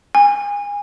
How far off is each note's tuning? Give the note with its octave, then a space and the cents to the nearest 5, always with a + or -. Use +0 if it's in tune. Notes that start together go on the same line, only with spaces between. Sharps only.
G#5 -25